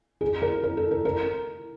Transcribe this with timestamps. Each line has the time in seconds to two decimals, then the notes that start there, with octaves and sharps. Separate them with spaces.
0.21 G#4
0.42 A#4
0.63 A#4
0.77 A4
0.91 A#4
1.05 A#4